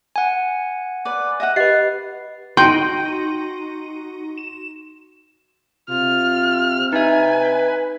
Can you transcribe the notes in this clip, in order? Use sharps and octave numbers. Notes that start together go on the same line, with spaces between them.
F#5 G#5
B4 D5
D#5 E5 F#5
G4 B4 D#5 F#5 A6 C7
D#4 F#4 G5 C6 D#7
E7
C3 F4 F6
D#4 B4 E5 G#5